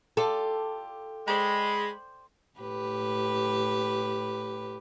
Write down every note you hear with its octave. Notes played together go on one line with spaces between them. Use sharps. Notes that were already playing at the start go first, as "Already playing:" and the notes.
F4 G4 A4 D5
G#3 C5 D5 G5 B5
A2 G4 B4